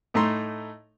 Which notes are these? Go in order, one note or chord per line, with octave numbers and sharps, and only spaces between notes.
A2 A3 D#4 A#5 C6